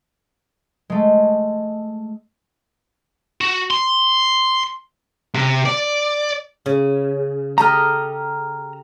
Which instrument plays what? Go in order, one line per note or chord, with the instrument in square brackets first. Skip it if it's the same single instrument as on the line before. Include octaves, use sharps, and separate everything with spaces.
[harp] G#3 A3
[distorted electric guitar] F#4
C6
C3
D5
[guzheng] C#3
[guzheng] G4 A4 D#5 [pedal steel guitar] A#5 F6